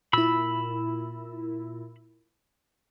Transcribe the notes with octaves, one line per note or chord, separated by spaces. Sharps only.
A#2 E4 B5 E6